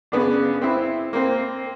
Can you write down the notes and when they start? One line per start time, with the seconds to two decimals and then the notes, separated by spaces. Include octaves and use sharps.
0.12 C#3 B3 D4
0.61 C4 E4
1.13 A#3 C4